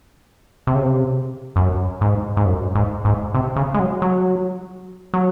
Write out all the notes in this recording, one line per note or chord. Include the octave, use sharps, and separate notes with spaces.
C3
C#3
C3
F#2
G#2
G#2
F#2
G#2
G#2
C3
C#3
G#3
F#3
F#3
F#3